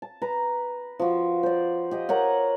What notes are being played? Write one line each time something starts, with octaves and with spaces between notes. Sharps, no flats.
A5
B4 A#5
F3 F#4
C5 D5
G4 D#5
A#4 C#5 F#5